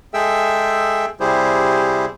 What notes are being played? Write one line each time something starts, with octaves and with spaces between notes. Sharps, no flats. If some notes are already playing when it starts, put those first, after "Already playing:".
G#3 G#4 A4 E5 G5 E6
C3 G3 E4 G4 G#4 C5